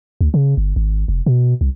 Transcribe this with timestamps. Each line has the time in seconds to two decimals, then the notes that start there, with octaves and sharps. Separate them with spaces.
0.21 D2
0.34 C#3
0.57 G1
0.76 G#1
1.08 F1
1.26 B2
1.61 C2